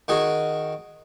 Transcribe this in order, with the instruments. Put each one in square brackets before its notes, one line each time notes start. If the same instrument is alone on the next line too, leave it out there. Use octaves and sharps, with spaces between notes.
[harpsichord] D#3 F#4 G#4